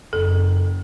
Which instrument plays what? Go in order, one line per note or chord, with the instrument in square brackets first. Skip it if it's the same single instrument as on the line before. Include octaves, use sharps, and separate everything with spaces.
[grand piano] F#1 [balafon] A4